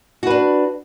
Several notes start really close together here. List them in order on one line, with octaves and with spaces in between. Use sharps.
F#4 B4 D4